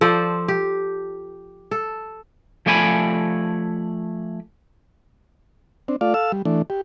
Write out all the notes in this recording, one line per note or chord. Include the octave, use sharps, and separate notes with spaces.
F3 A4 C5 D5
G4
A4
F3 A3 D5 G#5 B5
C4 D4
A3 F4 D5 F5
A4 F5 E6
G3
E3 A3 D4
G4